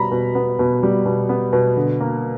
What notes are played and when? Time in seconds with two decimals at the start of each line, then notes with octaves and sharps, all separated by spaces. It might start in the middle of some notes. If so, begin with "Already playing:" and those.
Already playing: B2 G3 B3 A#5 B5
0.11 B2
0.35 B3
0.59 B2
0.83 G3
1.06 B2
1.29 B3
1.53 B2
1.77 D3
2.01 A#3